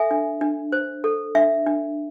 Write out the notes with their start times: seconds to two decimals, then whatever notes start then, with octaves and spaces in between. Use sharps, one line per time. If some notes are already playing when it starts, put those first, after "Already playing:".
Already playing: A4 E5 G#5
0.11 D4
0.41 D4
0.72 C5
1.04 A4
1.35 D4 E5
1.67 D4